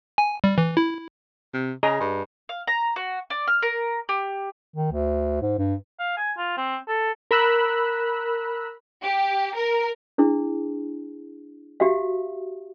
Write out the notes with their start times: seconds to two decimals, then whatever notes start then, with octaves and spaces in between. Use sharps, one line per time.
0.18 G#5
0.44 G3
0.58 E3
0.77 E4
1.53 C3
1.83 C#3 G#4 D#5 A#5
2.00 G2
2.49 F5
2.67 A#5
2.96 F#4
3.30 D5
3.48 F6
3.62 A#4
4.09 G4
4.76 D#3
4.92 D2
5.42 G#2
5.59 G2
5.99 F5
6.17 G#5
6.38 F4
6.57 C4
6.88 A4
7.31 A#4 B5 E6 F#6
9.03 G4
9.56 A#4
10.18 D4 E4 G#4
11.80 F#4 G4 E5 F5